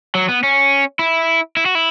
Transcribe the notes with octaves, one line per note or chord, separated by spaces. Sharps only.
F#3
B3
C#4
E4
E4
F#4
E4